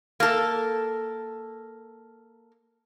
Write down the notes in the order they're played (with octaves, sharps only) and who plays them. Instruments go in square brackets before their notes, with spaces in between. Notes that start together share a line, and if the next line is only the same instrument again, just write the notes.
[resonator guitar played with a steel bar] A#3 A4